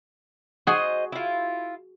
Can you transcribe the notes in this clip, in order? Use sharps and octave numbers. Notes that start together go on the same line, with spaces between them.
F#4 G#4 C5 D#5
E4 F4